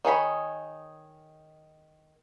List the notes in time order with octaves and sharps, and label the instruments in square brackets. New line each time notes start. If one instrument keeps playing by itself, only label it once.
[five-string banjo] D#3 G#4 C#5 B5